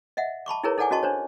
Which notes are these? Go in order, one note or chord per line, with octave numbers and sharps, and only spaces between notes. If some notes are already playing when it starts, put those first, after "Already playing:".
D#5 E5 F#5
A5 B5 C#6 D6
D#4 E4 G#4 A#4 B4 C#5
D#4 A4 D5 F#5 G#5 D6
C#4 F#4 D#5 A5 C#6
D4 C5 C#5